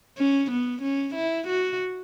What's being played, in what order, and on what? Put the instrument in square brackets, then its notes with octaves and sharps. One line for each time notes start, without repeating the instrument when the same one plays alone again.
[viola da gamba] C#4
B3
C#4
E4
F#4